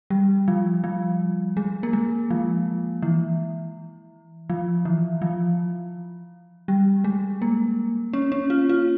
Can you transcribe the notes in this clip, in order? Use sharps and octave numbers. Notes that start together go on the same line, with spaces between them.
G3
F3
F3
G#3
A#3
G#3
F3
E3
F3
E3
F3
G3
G#3
A#3
C#4
C#4
F4
F4